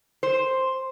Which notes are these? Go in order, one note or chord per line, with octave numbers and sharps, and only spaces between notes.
C5